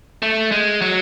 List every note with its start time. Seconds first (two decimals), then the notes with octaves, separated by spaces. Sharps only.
0.22 A3
0.52 G#3
0.82 F#3